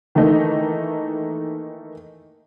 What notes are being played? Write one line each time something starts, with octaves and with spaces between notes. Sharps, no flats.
D#3 E3 A3 A#3 D#4